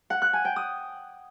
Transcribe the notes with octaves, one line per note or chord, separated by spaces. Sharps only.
F#5
F#6
G#5
G5
D#6